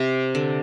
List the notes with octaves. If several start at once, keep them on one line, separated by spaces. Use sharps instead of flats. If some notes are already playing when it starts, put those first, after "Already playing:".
Already playing: C3
D3